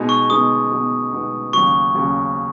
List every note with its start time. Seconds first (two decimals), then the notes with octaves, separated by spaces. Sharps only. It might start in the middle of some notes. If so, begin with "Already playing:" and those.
Already playing: B2 G#3 B3 D#4
0.09 C#6
0.29 B2 G#3 B3 D#4 D#6
0.71 B2 G#3 B3 D#4
1.12 B2 G#3 B3 D#4
1.53 D#2 C#3 F#3 C#6
1.95 D#2 C#3 F#3